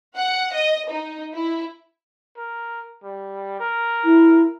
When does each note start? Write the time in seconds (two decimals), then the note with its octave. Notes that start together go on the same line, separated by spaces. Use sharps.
0.17 F#5
0.54 D#5
0.90 D#4
1.34 E4
2.37 A#4
3.04 G3
3.60 A#4
4.04 E4